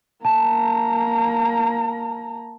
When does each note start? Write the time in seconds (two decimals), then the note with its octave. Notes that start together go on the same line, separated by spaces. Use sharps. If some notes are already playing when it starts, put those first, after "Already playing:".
0.25 A#3 A5 A#5